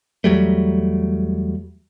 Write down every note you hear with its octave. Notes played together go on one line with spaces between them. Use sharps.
E2 F#3 G3 A3